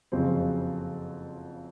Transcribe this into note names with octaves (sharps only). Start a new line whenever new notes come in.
F#1 F2 C#3 F#3 C4